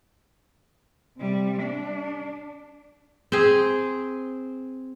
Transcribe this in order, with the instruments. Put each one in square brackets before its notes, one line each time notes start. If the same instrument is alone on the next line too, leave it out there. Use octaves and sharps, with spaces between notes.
[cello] C3 G3
D4
[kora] C4 G#4